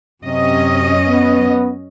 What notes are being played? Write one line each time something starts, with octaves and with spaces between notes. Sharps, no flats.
F#2 C3 C#4 D#5
B3